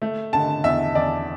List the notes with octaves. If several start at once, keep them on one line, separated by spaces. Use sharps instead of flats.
A3
D3 A5
E2 E5
E2 D5